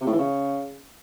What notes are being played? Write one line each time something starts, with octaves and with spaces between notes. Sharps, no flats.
C3
A2
E3
C#3